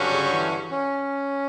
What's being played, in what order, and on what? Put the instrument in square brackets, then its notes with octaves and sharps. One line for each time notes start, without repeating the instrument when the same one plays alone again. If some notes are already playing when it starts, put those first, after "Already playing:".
Already playing: [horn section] G2 D3 F#3 C#4 F#4
[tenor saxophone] C#3
E3
C#4